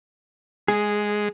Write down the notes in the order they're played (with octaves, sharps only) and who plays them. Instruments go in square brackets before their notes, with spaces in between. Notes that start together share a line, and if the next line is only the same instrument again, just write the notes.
[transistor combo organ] G#3 [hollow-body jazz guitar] G#4